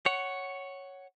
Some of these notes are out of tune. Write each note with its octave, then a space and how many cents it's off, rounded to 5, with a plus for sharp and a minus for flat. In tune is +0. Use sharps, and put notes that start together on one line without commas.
C#5 +0 F#5 +10